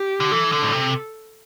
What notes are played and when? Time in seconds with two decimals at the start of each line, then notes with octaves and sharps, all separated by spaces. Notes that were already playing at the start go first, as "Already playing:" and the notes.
Already playing: G4
0.20 D3
0.31 E3 A4
0.52 D3
0.63 A2
0.72 C3